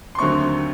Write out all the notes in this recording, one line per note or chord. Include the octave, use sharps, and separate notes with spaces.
C6
D#2 D3 F#3 A3 C4 C#6